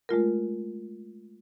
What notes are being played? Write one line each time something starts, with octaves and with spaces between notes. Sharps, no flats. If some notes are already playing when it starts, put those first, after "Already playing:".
G#3 A3 F4 A#4